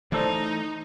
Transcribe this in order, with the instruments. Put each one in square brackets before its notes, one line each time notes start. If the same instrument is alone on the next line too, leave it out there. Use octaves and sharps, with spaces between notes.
[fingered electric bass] E3 A3 [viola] D#4 [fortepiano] A4 C5 D5